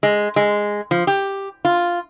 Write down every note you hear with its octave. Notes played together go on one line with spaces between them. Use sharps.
G#3
G#3
F3
G4
F4